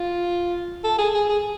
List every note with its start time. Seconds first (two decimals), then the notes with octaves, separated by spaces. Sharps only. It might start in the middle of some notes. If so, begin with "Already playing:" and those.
Already playing: F4
0.84 A4
0.98 G#4
1.14 G#4
1.29 G#4